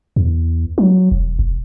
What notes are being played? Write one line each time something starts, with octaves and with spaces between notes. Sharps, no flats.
E2
F#3
E1
E1